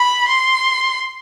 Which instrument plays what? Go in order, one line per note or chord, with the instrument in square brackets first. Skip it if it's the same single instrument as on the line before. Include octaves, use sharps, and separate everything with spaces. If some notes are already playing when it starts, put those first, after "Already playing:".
Already playing: [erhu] B5
C6